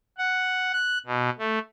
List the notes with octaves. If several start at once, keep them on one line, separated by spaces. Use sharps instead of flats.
F#5
F#6
B2
A3